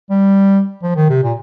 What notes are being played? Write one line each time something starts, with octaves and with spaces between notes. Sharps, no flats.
G3
F3
D#3
C3
A#2